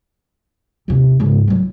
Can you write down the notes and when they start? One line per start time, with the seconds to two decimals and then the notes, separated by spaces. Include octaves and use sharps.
0.88 D#2 C3
1.20 G#2 C#3
1.48 B1 F#3